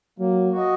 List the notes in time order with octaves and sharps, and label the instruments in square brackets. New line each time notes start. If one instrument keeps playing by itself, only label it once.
[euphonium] F#3 [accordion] A#3
[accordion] F#4 D#5